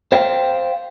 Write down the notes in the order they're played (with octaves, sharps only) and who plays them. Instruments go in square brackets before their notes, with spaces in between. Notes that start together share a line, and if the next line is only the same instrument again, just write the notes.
[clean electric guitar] C5 F5 G5